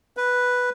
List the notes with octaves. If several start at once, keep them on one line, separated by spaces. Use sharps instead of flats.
B4